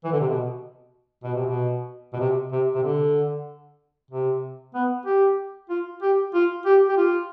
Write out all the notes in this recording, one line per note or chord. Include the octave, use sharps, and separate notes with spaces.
E3
D3
C3
B2
B2
C3
B2
B2
C3
C3
C3
D3
C3
B3
G4
F4
G4
F4
G4
G4
F4